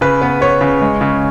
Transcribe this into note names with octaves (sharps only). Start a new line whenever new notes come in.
C#3 B4
B3
B3 C#5
C#3
G#3
C#3